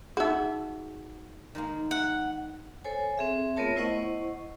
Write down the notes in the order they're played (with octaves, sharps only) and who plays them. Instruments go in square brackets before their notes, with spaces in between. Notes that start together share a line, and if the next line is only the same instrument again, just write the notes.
[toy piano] D#4 G#4 [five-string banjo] F#4 E5
[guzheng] D#3 G#3 A#3
[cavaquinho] F#5
[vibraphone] A4 C5 C#5 G#5
C4 G#4 E5
A3 B3 F4 A#4 C#5 A5
E4 C5 D#5 F#5 C#6